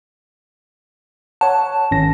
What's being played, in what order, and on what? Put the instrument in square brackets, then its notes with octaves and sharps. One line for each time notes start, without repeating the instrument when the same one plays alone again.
[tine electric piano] C#5 F#5 [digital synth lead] A5
[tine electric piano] G#1 C#4 A#6